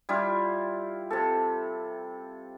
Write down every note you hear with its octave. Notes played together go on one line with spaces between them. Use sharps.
G3 E4 F4
C3 A4